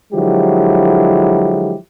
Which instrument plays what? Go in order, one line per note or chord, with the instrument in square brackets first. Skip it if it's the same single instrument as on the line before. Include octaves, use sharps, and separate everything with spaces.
[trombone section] D3 F3 F#3 G#3 E4 G4